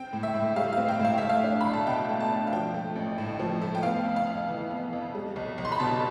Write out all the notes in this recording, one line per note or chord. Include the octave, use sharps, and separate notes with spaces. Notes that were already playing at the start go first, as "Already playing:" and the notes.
Already playing: C4 G5
A2
E5
A2
G3 F5
F5
C4
G5
A2 F5
A3 E5
F5
D4
B1 B5
A5
B2 G5
A3
A5
D4
F5
F3 G5
A3
A1
A2
F3
A3
G5
B3 F5
F2
F5
F2
E3
B3
F2
G3
B1
B1
C6
B5
B2 A5